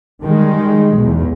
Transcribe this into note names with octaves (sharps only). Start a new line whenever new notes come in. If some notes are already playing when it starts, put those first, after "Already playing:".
D#3 G3 G#3
B1 E2